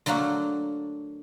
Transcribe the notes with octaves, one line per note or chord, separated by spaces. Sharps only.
D3 F#3 A3 A#3 F#5